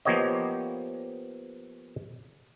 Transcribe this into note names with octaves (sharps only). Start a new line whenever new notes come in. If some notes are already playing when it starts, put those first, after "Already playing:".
F3 A#3 B3 G4 C#5 D#5